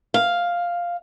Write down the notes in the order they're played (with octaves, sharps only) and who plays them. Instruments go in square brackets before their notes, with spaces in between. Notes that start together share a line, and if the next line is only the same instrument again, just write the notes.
[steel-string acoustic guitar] F5